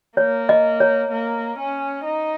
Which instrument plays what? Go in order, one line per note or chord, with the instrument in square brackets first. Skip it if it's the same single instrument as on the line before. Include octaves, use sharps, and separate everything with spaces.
[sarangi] A#3 [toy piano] C#5
[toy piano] D#5
C#5
[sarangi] A#3
C#4
D#4